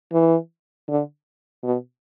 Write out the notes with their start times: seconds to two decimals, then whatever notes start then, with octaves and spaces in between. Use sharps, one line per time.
0.13 E3
0.89 D3
1.64 B2